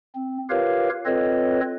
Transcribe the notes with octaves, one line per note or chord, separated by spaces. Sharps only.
C4
F4 G4 A#4 B4 C#5 F5
C4 F4 A4 B4 C#5 D#5